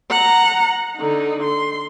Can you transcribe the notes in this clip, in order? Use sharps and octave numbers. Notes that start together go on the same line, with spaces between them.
F#5 A#5
D3 D#4
C6